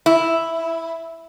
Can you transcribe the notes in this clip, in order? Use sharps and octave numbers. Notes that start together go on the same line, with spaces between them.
E4